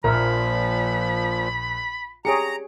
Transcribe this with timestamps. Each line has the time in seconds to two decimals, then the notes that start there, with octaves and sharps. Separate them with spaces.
0.04 A#1 A#2 F3 A#4 E5 B5
2.25 G4 G#4 C#5 A#5 C#7 D7